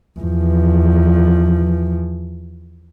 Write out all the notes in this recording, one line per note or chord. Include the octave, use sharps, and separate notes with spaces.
E2 F3